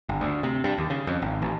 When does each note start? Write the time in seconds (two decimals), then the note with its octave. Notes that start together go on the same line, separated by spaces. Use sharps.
0.09 G1
0.21 D2
0.43 C3
0.64 G2
0.78 D#2
0.90 C#3
1.07 F2
1.22 G#1
1.42 A1